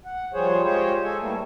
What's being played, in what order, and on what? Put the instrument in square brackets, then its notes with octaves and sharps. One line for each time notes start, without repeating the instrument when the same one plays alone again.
[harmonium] F#5
F3 G3 G#4 C5 C#5
G#3 F4 G4 G#4 C5 C#5
A4 G#5
E3 G3 A3 A#3